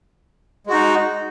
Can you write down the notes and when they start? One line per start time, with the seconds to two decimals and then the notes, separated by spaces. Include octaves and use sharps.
0.67 G#3
0.70 F#4
0.73 D#4